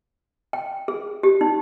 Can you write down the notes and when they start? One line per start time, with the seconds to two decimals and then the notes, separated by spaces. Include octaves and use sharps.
0.53 G5
0.88 G#4
1.23 G4
1.41 D#4